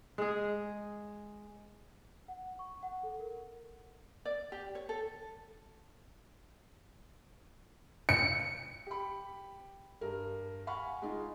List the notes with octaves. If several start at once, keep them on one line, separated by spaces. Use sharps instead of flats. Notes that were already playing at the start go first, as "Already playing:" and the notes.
G#3 G#4
F#5
C#6
F#5
A4
A#4
D5
G4
C#5
A4
C#7
G4 B5
G2 A#4
F5 F#5 G#5 B5 C#6
G#3 D#4 F4